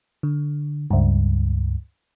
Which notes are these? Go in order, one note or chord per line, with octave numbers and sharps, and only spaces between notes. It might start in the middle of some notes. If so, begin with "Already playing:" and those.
D3
C#2 G2